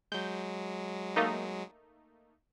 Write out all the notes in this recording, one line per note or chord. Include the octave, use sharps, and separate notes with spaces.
F#3 G#3 G6
A3 A#3 D#4